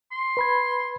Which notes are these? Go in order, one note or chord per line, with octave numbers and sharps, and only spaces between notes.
C6
B4 B5 G#6